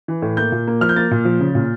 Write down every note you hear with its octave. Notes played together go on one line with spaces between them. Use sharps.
E3
A2
A#3 G6
A#2
A#3
F3 F6
G6
A#3 A6
A#2
F3
C#3
A#2